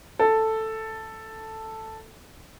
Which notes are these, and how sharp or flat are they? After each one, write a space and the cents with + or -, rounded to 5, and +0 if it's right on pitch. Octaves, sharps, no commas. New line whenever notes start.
A4 +5